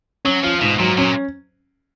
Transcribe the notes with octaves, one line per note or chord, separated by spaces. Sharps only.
F#3 C#4
F3 F4
G#2 B2
A#2 F#3
A#2 C#4